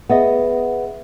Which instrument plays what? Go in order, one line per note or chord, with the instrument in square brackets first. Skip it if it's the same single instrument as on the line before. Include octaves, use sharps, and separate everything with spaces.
[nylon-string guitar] B3 D#5 [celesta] G#4 E5 F#5